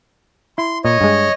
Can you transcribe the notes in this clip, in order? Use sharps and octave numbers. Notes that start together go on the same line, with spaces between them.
E4 C6
A#2 C#5 D#5
G2 G#3